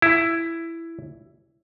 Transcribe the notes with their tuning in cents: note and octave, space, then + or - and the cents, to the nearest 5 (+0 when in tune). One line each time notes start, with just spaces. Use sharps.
E4 +10